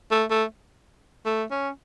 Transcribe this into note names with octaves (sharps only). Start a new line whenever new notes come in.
A3
A3
A3
C#4